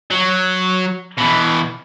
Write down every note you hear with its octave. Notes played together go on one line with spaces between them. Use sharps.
F#3
B2 E3